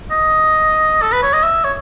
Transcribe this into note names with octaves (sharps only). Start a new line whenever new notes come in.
D#5
A4
B4
C#5
D#5
E5
C#5